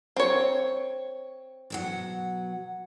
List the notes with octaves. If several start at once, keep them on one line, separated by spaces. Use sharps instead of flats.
C4 C#5
B2 F#3 F#5